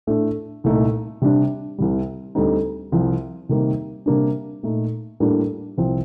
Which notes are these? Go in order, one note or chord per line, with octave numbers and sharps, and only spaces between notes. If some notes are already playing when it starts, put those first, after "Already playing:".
A2 A3 D4
C2 A#2 A3 D#4
C3 G3 D4
C2 C3 G3
D2 D3 G3 C4 D#4
C2 C3 F3
C3 D#3 G3 A#3
C3 G3 A#3 D4
A#2 A3 D#4
A2 G3 A#3 D4
C2 C3 F3 C4